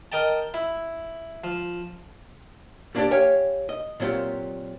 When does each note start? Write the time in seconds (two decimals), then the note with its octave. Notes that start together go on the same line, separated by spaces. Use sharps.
0.12 A#4 D#5 G5 A5
0.54 E4
1.44 F3
2.95 G3 A#3 D4 F4 G4 D5
3.11 G4 C#5 F5 G5 G#5
3.69 D#5
4.00 A#2 F#3 C4 F4 G4